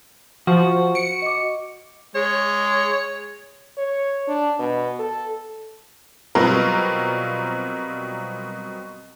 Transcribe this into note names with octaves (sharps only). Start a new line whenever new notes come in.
F3 F#4 C5
C#7 D7
D#5 D6
G#3 C#5
C#5
D4
B2
A4
B2 F#3 G3 C4 F4 A#4